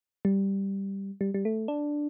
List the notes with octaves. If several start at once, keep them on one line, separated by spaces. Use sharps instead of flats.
G3
G3
G3
A3
D4